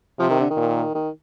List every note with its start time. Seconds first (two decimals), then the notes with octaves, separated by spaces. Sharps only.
0.19 C3 F3
0.30 D#3
0.40 D3
0.50 D#3
0.57 A#2
0.95 D#3